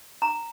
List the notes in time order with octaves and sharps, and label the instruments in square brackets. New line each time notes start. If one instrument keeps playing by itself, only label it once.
[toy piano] A#5